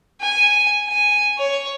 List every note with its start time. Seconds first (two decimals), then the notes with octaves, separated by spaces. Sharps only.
0.21 G#5
0.88 G#5
1.38 C#5